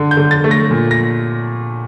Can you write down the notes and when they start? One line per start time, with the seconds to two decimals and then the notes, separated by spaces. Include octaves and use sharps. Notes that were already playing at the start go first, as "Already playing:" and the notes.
Already playing: D3
0.11 G6
0.17 D3
0.31 A6
0.44 A3
0.51 A#6
0.71 A#2
0.91 A#6